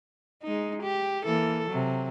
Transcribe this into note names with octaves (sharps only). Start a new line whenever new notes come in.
G#3 D#4
G4
E3 A#3 A4
C3 F#3